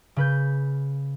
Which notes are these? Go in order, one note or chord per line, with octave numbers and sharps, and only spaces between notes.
C#3 B4 G6